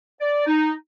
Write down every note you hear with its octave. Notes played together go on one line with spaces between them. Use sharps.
D5
D#4